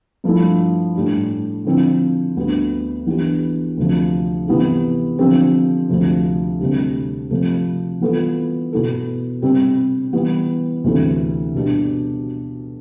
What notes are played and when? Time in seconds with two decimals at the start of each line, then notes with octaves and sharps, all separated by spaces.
0.24 G2 F3 A3 E4
0.95 A2 G3 D4
1.65 D3 F3 C4 E4
2.36 D2 D3 G3 B3
3.06 E3 B3 D4 G4
3.77 D2 C3 F3
4.48 C3 E3 B3 E4 G4
5.18 D3 F3 C4 G4
5.89 D2 C3 F3
6.60 D2 C3 G3 D4 G4
7.31 C3 F3 A3
8.01 E3 G3 B3 F4 A4
8.72 B2 B3 E4 A4
9.42 C3 G3 C4
10.13 E3 G3 B3
10.84 D2 C3 E3 A3
11.54 B2 G3 D4 G4